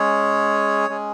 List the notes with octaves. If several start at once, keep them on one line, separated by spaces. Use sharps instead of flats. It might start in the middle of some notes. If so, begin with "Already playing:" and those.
Already playing: G#3 C#4 G#4 C#5
G#3 C#4 G#4